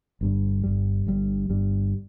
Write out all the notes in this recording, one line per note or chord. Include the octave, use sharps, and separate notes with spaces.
G1 G2 G3
G1 G2 G3
G1 G2 G3
G1 G2 G3